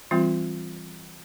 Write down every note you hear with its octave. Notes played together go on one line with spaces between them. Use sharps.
E3 G3 C4 F4